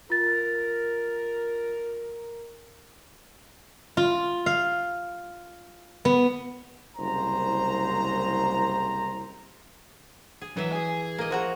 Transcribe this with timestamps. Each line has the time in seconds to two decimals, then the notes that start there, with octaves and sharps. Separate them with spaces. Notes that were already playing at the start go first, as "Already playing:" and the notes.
0.10 F4 A#4 A6
3.97 F4
4.46 F5
6.05 B3
6.97 F#1 C2 C5 A#5
10.41 G#4
10.57 E3 F#3 E5
10.73 G#4 G#5
11.18 A#3 D#5
11.30 F3 F#4 A#5